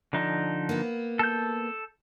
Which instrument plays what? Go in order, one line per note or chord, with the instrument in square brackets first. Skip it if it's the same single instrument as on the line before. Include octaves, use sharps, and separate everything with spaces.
[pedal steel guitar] D3 F3 D#4
[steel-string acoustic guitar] A#3 B3
[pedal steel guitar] A4 G6